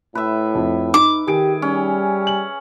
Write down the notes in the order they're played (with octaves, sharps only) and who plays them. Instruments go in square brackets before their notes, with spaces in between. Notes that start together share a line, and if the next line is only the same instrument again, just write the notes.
[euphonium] A2 [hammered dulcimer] B4 E5
[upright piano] F2
[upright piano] D#4 [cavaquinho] D6
[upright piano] D#3 D7 [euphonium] G4 [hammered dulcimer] G#4
[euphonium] G3 [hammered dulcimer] C#4
[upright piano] F#7